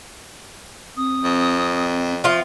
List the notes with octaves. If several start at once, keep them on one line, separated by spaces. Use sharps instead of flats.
C4 D#6
F2
F3 C4 F4 E5